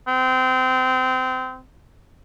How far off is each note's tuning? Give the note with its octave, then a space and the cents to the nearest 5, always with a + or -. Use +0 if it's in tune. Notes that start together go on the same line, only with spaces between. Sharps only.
C4 -25